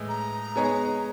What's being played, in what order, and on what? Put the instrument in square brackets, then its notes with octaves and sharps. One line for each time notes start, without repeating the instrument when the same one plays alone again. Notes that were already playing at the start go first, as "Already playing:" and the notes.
Already playing: [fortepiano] A2 E3 G#3
[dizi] A#5
[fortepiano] G#3 B3 D#4 G#4 C#5